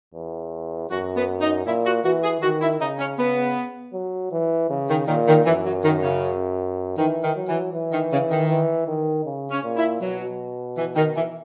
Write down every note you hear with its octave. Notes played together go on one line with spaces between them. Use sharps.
E2
F#2 F#4
B3
D#4
A#2 E4
F#4
E3 F#4
G#4
D#3 F#4
E4
C#3 D#4
C#4
C#3 B3
F#3
E3
C#3
D#3
A#2 D#3
D#3
F#2 E3
F#3
D#3
C#3
D#3 E3
D#3
F#3
E3
E3
D#3
C#3
D#3
E3
D#3
C#3
C#4
A#2
E4
B2 F#3
E3
D#3
E3